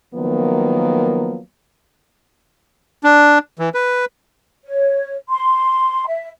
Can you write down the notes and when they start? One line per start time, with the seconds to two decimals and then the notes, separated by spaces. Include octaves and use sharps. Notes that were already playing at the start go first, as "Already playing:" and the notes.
0.15 D#3 F3 F#3 A#3 B3
3.04 D4
3.59 E3
3.74 B4
4.65 C#5
5.29 C6
6.08 E5